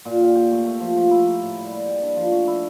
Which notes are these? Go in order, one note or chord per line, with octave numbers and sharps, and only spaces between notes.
A#2
G4
G4
A3
A3
F3
F3
E4
A#3
A2
G3
G3
G4
D4
F3
A3
E4